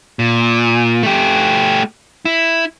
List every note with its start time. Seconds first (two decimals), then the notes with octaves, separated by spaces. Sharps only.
0.19 A#2
1.03 A3 G4
2.25 E4